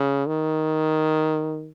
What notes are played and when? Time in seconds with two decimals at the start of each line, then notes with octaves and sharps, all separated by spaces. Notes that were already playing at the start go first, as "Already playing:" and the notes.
Already playing: C#3
0.27 D#3